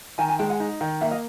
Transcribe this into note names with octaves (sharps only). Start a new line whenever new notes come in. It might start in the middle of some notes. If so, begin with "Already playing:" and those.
D#3 G#5 A#5
G#5 A#5
G#3 G5 A5
F#5 G#5
D#4
D#3
A#3 E5 F#5
D#5 F5